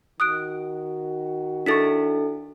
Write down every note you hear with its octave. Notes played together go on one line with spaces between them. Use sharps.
D#3 F#4 D#6 F#6 D7
D4 E4 A4 C#6 A6 B6